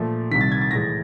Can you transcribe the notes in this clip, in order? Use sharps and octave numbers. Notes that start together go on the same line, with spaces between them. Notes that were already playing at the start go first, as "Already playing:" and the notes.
Already playing: A#2 F3 A3
C2 C3 D#3 B6
A6
G#6
A6
A2 E3 G#3 A#6